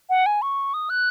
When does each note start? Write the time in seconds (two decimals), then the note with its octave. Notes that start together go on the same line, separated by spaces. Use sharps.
0.10 F#5
0.26 G#5
0.42 C#6
0.74 D#6
0.90 F#6